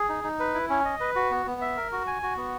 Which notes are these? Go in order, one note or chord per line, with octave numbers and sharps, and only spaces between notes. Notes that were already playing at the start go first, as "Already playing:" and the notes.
Already playing: G#4
D#4
D#4
B4
E4
C#4
D#5
B4
F#4
B3
B3
E5
A#4
F#4
G#5
F#4
B3